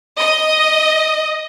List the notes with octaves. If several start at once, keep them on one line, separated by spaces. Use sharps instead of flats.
D#5